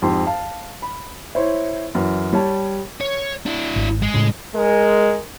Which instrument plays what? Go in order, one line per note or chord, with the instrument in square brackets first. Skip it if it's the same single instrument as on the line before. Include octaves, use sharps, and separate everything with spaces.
[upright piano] F2 G#2 G4 C6
F5 A5
B5
E4 C5 C#5
F#2 E3
G3 C#5 A5
[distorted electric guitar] C#5
D4 E4
[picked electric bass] G#1
[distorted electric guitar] G#3
[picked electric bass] A2 C#3
[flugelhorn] G#3 [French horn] A#4